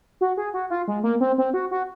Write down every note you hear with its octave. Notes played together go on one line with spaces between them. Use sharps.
F#4
G#4
F#4
F4
G#3
A#3
C4
C4
F#4
F#4